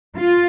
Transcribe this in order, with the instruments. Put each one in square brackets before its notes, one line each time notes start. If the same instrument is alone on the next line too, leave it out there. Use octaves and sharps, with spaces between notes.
[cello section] F4